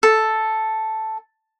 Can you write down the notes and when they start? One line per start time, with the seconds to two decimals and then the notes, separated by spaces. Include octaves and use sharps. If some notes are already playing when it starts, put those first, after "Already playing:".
0.03 A4